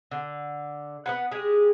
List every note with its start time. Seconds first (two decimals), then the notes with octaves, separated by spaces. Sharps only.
0.12 D3
1.06 B3 B4 F#5
1.31 G#3 G4 G#4